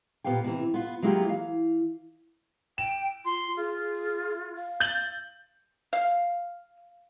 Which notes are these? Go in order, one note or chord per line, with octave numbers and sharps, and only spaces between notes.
A#2 B3 G4 F5 G5
C3 E3
B3 F4
F#3 G#3 A#3 E4 F4 G4
E3 F5
G5 E7
F4 C6
F4 G#4
F5
G6 A6 F#7
F5